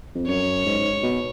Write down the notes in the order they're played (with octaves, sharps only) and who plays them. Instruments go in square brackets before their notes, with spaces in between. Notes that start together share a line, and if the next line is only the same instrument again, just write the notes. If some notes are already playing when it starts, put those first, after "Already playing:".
[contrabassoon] F2
[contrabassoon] F#2 [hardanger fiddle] C#5
[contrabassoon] G#2
G#2
B2